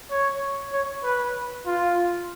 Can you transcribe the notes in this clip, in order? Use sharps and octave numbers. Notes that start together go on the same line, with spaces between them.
C#5
C#5
B4
F4